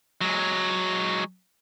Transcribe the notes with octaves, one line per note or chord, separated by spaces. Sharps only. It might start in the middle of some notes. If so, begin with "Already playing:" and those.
F#3 G#3